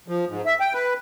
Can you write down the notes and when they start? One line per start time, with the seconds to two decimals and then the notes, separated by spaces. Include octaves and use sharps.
0.08 F3
0.29 G#2
0.46 E5
0.60 G5
0.73 B4